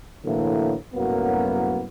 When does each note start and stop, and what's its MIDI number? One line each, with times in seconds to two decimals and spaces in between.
0.25 0.74 45
0.25 0.74 50
0.25 0.74 52
0.25 0.74 54
0.25 0.74 58
0.95 1.84 36
0.95 1.84 42
0.95 1.84 45
0.95 1.84 54
0.95 1.84 58
0.95 1.84 59